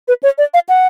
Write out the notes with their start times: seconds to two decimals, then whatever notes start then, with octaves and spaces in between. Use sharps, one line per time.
0.08 B4
0.23 C#5
0.38 D5
0.54 F5
0.69 F#5